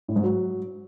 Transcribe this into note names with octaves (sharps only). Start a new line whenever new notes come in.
A2
G#2
F#3